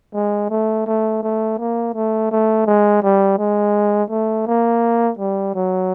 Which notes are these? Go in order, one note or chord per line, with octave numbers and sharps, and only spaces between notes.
G#3
A3
A3
A3
A#3
A3
A3
G#3
G3
G#3
A3
A#3
G3
F#3